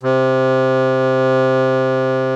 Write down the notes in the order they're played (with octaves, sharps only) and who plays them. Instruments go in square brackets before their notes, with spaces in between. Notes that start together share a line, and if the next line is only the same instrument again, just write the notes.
[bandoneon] C3